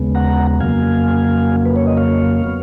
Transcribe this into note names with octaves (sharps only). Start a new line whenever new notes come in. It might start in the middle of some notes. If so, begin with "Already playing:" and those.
Already playing: D#2 C#3 G#3 B3
F#5 A#5
F2 C#3 F#3 A#3 F5 G#5
B4
C#5
D#5
C#5 F5
F#3 B3